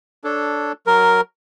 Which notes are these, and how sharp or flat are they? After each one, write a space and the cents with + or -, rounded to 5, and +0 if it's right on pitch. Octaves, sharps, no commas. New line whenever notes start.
D4 +0 A4 +0 C#5 +10
F#3 +0 A#4 +0